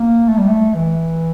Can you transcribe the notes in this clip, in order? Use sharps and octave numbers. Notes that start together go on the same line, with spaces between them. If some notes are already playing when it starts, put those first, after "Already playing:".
Already playing: A#3
A3
G3
A3
E3